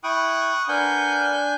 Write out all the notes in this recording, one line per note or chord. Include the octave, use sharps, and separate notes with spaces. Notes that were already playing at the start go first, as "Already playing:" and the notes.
E4 G5 C#6 D#6 F#6
D4 A#4 B4 F#5 G#5 G6